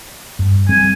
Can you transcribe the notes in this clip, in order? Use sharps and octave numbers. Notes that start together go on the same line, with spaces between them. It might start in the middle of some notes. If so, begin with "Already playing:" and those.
G2
G3 G#3 C4 G#5